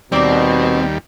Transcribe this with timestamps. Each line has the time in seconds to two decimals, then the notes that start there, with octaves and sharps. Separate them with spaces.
0.12 D#2 B2 G3 C4 A#4 D5